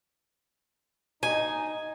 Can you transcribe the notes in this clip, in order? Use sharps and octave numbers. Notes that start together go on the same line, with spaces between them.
D#4 G#5